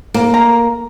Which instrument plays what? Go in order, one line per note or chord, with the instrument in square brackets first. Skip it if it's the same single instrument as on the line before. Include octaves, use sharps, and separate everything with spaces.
[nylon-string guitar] A#3
[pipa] A#5